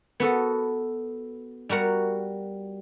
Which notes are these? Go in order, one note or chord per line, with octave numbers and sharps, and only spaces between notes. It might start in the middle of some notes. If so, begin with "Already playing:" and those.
B3 F#4 A4
G3 F#4 A#4 F#5